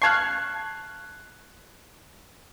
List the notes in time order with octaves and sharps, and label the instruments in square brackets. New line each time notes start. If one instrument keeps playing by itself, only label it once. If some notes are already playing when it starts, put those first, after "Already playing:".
[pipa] F5 A5 C#6 [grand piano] F#6 G#6 C7